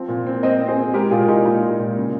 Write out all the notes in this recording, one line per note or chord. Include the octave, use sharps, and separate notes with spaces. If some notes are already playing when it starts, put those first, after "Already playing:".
Already playing: F3 C4
A#2
C4
C4 C5 D#5
C4
G#4 C5
C4
G#3 G4 A#4
A#2 F4 G#4
A#2 D#4 G4
D#4 F4
G#3
A#2
C#3